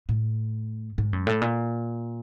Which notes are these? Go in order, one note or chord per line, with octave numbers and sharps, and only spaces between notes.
A2
G#2
F#2
A2
A#2